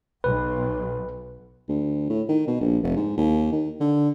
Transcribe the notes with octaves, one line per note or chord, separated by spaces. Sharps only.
B1 B4
D2
A2
D#3
B2
A#1
F1
G#2
D#2
D#3
D3